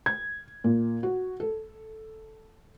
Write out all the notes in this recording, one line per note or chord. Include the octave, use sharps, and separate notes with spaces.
G#6
A#2
F#4
A4